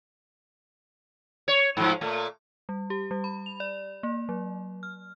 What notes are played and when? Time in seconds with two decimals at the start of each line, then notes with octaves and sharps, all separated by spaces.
1.48 C#5
1.77 G#2 F3
2.01 A#2 A3
2.69 G3
2.90 G4
3.11 G3
3.24 B5
3.46 F7
3.60 D5
4.03 A#3
4.29 F#3
4.83 F6